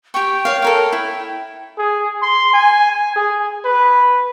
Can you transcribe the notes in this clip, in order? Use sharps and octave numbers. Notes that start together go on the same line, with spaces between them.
G4 G5 C#6
C#5 F5
A4 A#4 C#5
E4
G#4
C6
G#5
G#4
B4